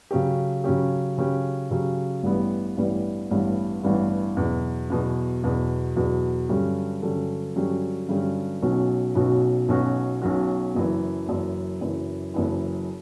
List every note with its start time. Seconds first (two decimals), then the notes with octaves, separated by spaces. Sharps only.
0.11 C#3 F#3 C#4 G4
0.64 C#3 F#3 C#4 G4
1.18 C#3 F#3 C#4 G4
1.71 C#3 F#3 C#4 G4
2.23 A1 G2 E3 G3 B3
2.77 A1 G2 E3 G3 B3
3.31 A1 G2 E3 G3 B3
3.83 A1 G2 E3 G3 B3
4.37 E2 B2 F#3
4.90 E2 B2 F#3
5.44 E2 B2 F#3
5.96 E2 B2 F#3
6.49 G2 D3 F#3 C#4 G4
7.02 G2 D3 F#3 C#4 G4
7.56 G2 D3 F#3 C#4 G4
8.09 G2 D3 F#3 C#4 G4
8.62 B1 B2 F#3 C#4 F#4
9.15 B1 B2 F#3 C#4 F#4
9.68 B1 B2 F#3 C#4 F#4
10.22 B1 B2 F#3 C#4 F#4
10.75 F#1 F#2 E3
11.28 F#1 F#2 E3
11.81 F#1 F#2 E3
12.34 F#1 F#2 E3